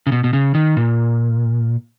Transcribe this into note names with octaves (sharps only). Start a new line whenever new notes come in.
C#3
B2
B2
C#3
D#3
A#2